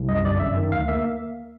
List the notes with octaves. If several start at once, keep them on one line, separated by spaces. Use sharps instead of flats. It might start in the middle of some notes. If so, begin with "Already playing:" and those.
Already playing: C2
F#2 D#5
G1 D5
F#2 E5
D#3
D2 F5
A#3 E5